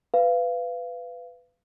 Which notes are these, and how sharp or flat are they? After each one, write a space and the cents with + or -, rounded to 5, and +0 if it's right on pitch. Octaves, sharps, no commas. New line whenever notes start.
B4 +15 F5 -20